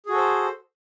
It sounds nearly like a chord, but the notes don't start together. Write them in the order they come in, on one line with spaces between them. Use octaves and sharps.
G#4 F#4 A4 C5